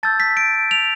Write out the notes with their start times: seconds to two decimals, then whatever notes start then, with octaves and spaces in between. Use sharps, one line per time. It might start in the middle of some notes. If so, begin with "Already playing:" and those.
0.03 A5 E6 G6 A6
0.20 B6
0.37 D7
0.71 F7